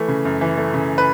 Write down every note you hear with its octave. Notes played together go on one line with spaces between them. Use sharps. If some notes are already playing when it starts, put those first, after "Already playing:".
Already playing: E3 A3
C#3
F#2
E3
A3
C#3
B4